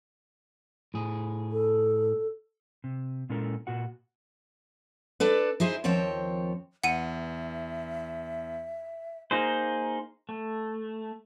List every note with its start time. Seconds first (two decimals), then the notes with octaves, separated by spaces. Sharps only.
0.94 A2 G#4
1.52 A4
2.84 C3
3.29 A#2 G#3 C#4 E4 A4 A#4
3.67 A#2 F#4 F#5
5.20 D4 A4 B4
5.60 D#4 E4 G#4 C5
5.84 D#2 F3 C4 C#5 G5
6.84 E2 E5 F#5 C#7 D#7
9.31 A#3 D#4 G#4 C5
10.29 A3